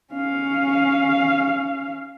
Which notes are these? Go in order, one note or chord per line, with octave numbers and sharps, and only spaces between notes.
C#4 F5